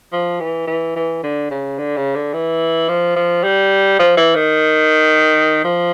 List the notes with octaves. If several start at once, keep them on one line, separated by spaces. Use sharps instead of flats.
F3
E3
E3
E3
D3
C#3
D3
C#3
D3
E3
F3
F3
G3
F3
E3
D#3
F3